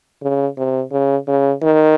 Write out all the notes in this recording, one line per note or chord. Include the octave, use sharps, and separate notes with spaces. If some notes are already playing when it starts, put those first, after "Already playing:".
C#3
C3
C#3
C#3
D#3